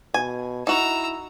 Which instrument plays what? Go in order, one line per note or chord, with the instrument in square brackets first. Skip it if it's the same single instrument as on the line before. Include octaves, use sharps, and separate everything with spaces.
[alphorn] B2 [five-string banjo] G#5
[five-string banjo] D#4 F#4 [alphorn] E4 [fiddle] A#5 E6